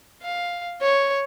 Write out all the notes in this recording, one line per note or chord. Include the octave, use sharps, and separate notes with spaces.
F5
C#5